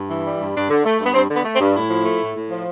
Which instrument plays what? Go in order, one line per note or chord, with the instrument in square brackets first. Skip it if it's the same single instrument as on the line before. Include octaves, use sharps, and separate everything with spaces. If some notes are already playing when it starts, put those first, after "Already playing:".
Already playing: [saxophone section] G2
E3
G3
G2
G2 D4
D3
A3
G2
B3
G2 C4
D3
B3
A3
C4
G2
A2 E4
F3
A3
A2
A2
F3